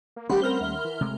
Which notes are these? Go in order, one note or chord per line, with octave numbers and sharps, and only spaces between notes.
A#3
D#3 G3 A3 C#4 G4 F#5 B5 C6
C4 A#4 C5 F6 G7
D#2 E5
E3
D#1 C3 G#3 A3